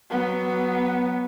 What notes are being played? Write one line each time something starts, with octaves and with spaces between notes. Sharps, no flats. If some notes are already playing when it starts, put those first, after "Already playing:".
F#3 B3